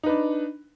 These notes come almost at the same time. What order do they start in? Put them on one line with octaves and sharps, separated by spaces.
D#4 B4 D4